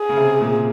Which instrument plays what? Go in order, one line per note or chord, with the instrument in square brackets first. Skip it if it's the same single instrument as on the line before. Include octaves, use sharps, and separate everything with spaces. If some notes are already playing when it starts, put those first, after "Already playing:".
Already playing: [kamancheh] G#4
[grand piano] C#3
C3
A#2